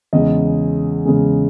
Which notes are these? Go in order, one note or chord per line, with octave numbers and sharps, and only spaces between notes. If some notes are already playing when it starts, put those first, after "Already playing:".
E2 C#3 G#3 D#5
E2 C#3 G#3